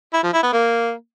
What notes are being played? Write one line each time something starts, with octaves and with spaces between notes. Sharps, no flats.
E4
F3
E4
B3
A#3